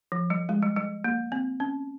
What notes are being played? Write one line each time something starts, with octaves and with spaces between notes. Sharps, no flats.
F3
G3
G#3
G3
G3
A#3
C4
C#4